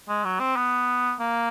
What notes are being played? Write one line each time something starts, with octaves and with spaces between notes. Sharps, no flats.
G#3
F#3
C4
B3
A#3